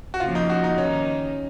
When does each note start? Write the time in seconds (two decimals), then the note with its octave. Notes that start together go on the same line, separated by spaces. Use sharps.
0.14 F#4
0.20 C#3 F3 A#3 F4
0.35 D#4
0.50 F#4
0.64 D#4
0.78 D#3 A#3 C#4 D#4